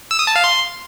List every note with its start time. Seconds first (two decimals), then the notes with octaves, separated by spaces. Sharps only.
0.11 E6
0.19 D#6
0.27 A5
0.36 F5
0.44 C6